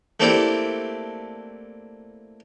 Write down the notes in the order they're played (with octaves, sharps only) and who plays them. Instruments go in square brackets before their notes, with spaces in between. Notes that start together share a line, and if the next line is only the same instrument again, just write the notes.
[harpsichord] A3 A#3 C4 D4 E4 G4